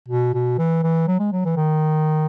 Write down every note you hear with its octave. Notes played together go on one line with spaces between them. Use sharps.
B2
B2
E3
E3
F#3
G#3
F#3
E3
D#3